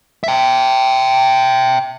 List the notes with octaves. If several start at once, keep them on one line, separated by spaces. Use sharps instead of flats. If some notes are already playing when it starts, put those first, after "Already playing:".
E5 G5